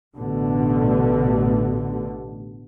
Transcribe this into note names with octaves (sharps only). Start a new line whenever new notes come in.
A1 B2 D3